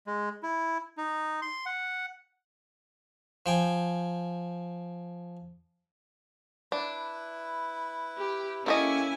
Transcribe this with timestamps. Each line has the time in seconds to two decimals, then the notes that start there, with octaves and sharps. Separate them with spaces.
0.07 G#3
0.43 E4
0.98 D#4
1.42 C6
1.66 F#5
3.46 F3 G5 G#5
6.72 D4 E4 B4
8.17 G4
8.66 A#3 C#4 E4 G4 A4 D#5 G#5 C#6